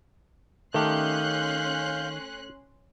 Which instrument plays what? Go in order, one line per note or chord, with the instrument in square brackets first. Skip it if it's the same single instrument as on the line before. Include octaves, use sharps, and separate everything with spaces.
[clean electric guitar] D#3 G4 [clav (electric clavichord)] A3 [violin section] C#4 C6 F#6 [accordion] F5 G6